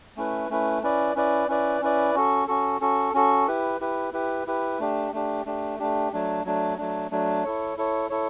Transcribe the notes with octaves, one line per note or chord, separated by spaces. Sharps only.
A3 C#4 E4 B4
A3 C#4 E4 B4
C#4 E4 B4 D5
C#4 E4 B4 D5
C#4 E4 B4 D5
C#4 E4 B4 D5
C#4 F#4 A4
C#4 F#4 A4
C#4 F#4 A4
C#4 F#4 A4
E4 G4 B4
E4 G4 B4
E4 G4 B4
E4 G4 B4
A3 D4 G4
A3 D4 G4
A3 D4 G4
A3 D4 G4
F#3 A3 D4
F#3 A3 D4
F#3 A3 D4
F#3 A3 D4
E4 A4 C#5
E4 A4 C#5
E4 A4 C#5